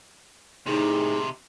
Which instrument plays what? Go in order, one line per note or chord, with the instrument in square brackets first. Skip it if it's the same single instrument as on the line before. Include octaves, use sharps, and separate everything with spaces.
[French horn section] A2 G#4 [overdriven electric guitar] C3 D#3 [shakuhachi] D#4